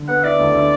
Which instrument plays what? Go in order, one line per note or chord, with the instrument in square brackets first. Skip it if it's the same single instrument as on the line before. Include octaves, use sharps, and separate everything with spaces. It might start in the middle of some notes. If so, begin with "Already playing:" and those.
Already playing: [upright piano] D3
[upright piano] B3 [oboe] F#5
[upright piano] E4 [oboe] D5
[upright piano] D2
D3